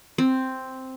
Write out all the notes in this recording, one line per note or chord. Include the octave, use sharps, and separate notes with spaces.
C4